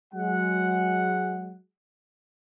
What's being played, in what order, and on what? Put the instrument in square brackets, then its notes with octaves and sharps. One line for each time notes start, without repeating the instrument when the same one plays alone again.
[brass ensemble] F#3 G#3 F#5